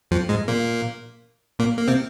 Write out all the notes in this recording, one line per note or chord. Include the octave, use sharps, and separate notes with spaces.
F2 F3
G#2 G#3
A#2 A#3
A#2 A#3
A#3
C3 C4